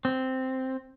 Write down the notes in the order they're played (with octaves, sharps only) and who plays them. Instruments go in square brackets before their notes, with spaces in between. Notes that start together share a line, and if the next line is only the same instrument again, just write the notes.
[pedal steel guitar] C4